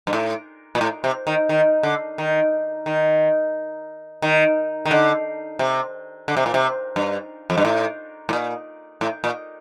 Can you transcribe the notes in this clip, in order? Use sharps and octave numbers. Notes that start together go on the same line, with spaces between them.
G2
A2
A#2
A2
C3
D#3
D#3
D3
D#3
D#3
D#3
D#3
D3
C3
D3
C3
A#2
C3
G2
F2
G2
A2
A2
A#2
A2
A#2